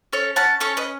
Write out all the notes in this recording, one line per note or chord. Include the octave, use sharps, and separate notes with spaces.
C#4 A4 C#5
C#4 F#5 A5
C#4 A4 C#5
B4 D#5